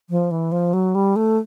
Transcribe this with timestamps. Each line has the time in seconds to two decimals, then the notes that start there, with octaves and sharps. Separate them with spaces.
0.10 F3
0.31 E3
0.52 F3
0.73 F#3
0.95 G3
1.16 A3